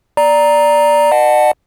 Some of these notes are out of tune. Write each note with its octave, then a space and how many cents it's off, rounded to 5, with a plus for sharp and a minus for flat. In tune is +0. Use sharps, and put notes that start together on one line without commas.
D5 +0 A#5 +0
D#5 -45 F#5 +0 A5 -10